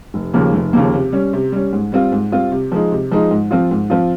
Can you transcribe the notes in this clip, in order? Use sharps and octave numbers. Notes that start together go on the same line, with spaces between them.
F1
D#2 C#3 F3 A#3
F1
D#2 C#3 F3 A#3
C3
G3 C#4
C3
G3 C#4
G#2
G3 C4 F4
G#2
G3 C4 F4
C3
F3 G#3 D#4
C3
F3 G#3 D#4
G#2
F3 C4 F4
G#2
F3 C4 F4